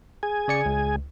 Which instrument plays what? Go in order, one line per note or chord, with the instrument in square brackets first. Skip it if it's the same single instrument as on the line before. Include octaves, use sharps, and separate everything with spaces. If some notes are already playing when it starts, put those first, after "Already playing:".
[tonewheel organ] G#4 G#5
[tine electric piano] C#3 D5 C#7
C#2